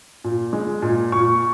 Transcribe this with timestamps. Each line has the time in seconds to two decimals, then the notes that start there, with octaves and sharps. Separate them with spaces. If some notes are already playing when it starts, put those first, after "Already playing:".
0.24 A#2
0.53 G#3
0.82 A#2
1.12 A#2 C#6